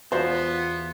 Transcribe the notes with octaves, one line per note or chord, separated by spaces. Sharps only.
E2 B3 F4 F#4 C5 E5